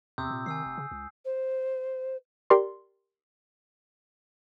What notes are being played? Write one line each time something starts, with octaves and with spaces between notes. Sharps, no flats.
E2 C3 D#6 E6 G6
A#2
D#3 G#5 E6 C7
F1
C#3
C#2
C5
G4 A#4 D5 C6